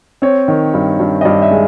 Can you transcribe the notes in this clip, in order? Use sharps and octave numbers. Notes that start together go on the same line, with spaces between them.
C4 C#5
D#3
G2
G2
D#5
G2 D5
E5
G#3